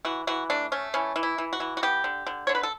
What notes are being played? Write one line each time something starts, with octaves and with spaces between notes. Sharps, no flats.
E3 F#4
E3 F#4
A3 D4
A3 C#4
E3 C#4
E3
E4
E3
F#4
E3
F#4
B3 G4
D3
D3
D3 C#5
B4
A4